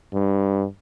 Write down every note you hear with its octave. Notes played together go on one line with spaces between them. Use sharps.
G2